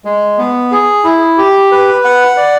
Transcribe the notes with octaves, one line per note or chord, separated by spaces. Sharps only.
G#3
B3
G#4
E4
G4
B4
F#5
D5